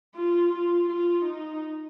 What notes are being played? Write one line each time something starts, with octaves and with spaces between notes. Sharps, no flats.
F4
F4
F4
D#4